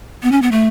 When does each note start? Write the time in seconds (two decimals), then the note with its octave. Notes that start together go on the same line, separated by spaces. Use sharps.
0.23 B3
0.32 C#4
0.42 B3
0.52 A3